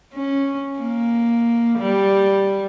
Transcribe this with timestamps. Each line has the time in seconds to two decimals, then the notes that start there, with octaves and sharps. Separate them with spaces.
0.14 C#4
0.79 A#3
1.79 G3